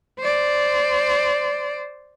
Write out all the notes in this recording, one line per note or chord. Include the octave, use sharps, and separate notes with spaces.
C5 D5